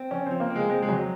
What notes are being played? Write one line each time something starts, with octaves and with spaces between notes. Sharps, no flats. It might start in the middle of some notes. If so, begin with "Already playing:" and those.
Already playing: C4
F2 C#4
F3 C4
A#3
C4
G#3
G#3 C4
G#3
F2 F#3